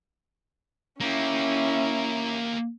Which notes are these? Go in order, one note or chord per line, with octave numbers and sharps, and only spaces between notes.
A#3 C#4 E4 G4